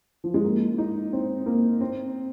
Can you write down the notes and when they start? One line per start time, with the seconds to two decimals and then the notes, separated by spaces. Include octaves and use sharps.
0.24 F3
0.34 G#3
0.44 A#3
0.78 D#4
1.13 C4
1.46 A#3
1.81 C4